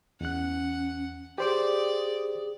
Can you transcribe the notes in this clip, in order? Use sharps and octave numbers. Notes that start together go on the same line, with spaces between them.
E2 C#4 F#5 F#6
G4 G#4 C5 D5 D6